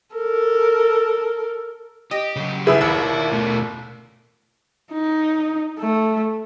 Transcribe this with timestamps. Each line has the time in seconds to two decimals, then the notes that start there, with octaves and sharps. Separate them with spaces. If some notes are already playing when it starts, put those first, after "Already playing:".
0.15 A4 A#4
2.11 G4 D#5
2.36 C#3 F#3
2.67 C2 E4 G#4 B4 E5
2.81 D#2 E4 A#4 D5 E6
3.32 B2 A3
4.92 D#4
5.80 A3